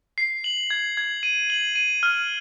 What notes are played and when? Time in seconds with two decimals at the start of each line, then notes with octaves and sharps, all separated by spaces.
0.18 C7
0.44 F#7
0.70 G#6
0.97 G#6
1.23 D#7
1.50 F#7
1.76 D#7
2.03 F6